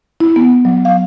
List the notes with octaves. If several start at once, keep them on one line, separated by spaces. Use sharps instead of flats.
E4
B3
F#3
F5